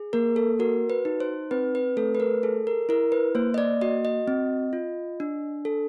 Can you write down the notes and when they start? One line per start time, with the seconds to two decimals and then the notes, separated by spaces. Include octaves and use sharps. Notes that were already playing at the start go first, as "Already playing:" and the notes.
Already playing: G#4
0.13 A#3 A#4
0.36 A4
0.59 F#4 A#4
0.90 B4
1.05 D#4
1.20 C5
1.51 C4 B4
1.75 B4
1.97 A3 A4
2.15 B4
2.20 A#4
2.43 G#4 A4
2.67 A#4
2.89 E4 A#4
3.12 B4
3.35 A#3 C5
3.54 D#5
3.58 D5
3.81 F#4 D#5
4.05 D#5
4.28 C4
4.73 F4
5.20 D4
5.65 A4